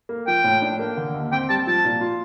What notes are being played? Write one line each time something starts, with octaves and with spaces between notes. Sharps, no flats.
A#3
F3 G5
A2
D4
A#3
D3
D#2
C4 G5
G3 A5
F3 A5
A#2
F4